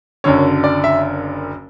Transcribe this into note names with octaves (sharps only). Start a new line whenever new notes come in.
F#1 F#2 D3 C#5
D5
E5